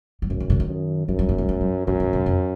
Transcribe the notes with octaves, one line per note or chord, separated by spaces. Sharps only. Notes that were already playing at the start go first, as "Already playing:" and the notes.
F#3
F#2 F3
D#3
D3
D#3
F#2
F#2 F3
F#3
A#3
G#3
G#3
F#3
F#2 D3
G#2
F2
F2